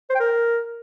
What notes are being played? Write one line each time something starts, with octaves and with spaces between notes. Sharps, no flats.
C5
G5
A#4